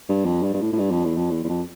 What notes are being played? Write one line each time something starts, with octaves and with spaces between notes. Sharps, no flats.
G2
F2
G2
G2
A2
A2
G2
F2
E2
F2
E2
E2
F2